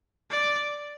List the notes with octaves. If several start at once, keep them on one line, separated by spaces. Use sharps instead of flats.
D5